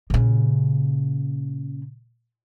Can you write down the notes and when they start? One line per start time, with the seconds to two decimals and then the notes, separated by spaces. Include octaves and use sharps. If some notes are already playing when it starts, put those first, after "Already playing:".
0.10 A#2 C#3